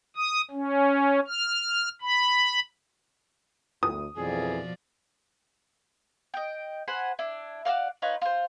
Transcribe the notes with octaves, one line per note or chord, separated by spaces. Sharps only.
D#6
C#4
F6
B5
D2 D#6
F2 B2 E3 F3 G#4 D5
D#5 G5
C5 F#5 G#5 B5
D4 E4
F#4 A#4 D5 F5
D#4 F4 B4 C#5
F4 C5